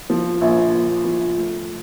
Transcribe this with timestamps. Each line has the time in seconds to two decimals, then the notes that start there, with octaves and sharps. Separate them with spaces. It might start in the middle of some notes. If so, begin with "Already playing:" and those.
0.10 F3
0.41 A#1
0.73 A#1
1.05 F3
1.36 A3